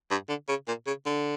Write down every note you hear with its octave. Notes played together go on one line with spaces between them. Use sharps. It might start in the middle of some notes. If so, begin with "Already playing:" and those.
G2
D3
C#3
A#2
C#3
D3